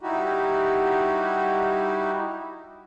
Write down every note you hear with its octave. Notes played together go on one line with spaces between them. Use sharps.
G3 D#4 E4 F#4 G4